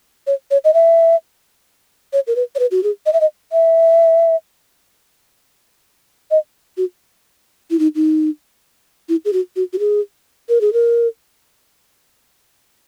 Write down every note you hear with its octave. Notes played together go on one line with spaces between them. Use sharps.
C#5
C#5
D#5
E5
C#5
A#4
B4
C#5
B4
F#4
G#4
D#5
E5
D#5
E5
D#5
F#4
E4
D#4
D#4
E4
G#4
F#4
F#4
F#4
G#4
A#4
G#4
A#4